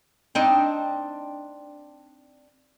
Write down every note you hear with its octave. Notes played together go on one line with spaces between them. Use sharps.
C4 D4 D#4